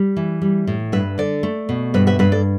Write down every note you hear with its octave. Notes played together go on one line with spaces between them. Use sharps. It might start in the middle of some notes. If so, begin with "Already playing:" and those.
Already playing: G3
E3
G3
A2
G2 B4 E5
D3 A4 D5
A3
B2
G2 B4 E5
B4 E5
G2 B4 E5
A4 D5